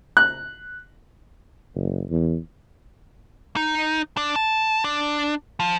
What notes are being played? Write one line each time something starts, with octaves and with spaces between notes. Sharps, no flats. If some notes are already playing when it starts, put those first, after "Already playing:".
F#6
F#1
E2
D#4
D4
A5
D4
F3